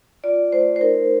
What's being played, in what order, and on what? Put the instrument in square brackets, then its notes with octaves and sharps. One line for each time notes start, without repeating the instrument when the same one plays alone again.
[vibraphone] F4 D5
A3 C5
C5
D#4 A#4